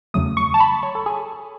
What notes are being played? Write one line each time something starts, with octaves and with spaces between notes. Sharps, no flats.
E2 C#3 F#3 A3 D#6
C#6
A5
B5
C#5
A4
G#4